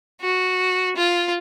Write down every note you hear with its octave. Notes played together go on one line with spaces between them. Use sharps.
F#4
F4